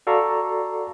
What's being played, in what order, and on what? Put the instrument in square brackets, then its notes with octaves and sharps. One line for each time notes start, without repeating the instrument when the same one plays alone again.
[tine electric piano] F#4 A4 D5 F5 A#5 C#6